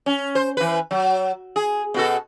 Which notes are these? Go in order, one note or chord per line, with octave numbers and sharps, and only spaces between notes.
C#4
C5
E3 B4
F#3
G#4
B2 F#4 A4